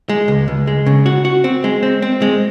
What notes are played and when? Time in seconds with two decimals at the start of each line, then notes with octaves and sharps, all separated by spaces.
0.09 G#3
0.28 C#2
0.48 C#2
0.67 G#3
0.86 C#3
1.06 F#4
1.25 F#4
1.44 C4
1.64 G#3
1.83 C4
2.02 C4
2.22 G#3